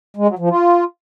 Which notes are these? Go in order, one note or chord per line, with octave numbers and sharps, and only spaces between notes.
G#3
F#3
F3
F4